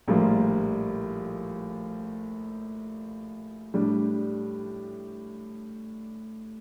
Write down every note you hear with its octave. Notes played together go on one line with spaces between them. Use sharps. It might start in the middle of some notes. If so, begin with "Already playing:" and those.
A#1 A2 G3 A#3 F4
A2 G3 D4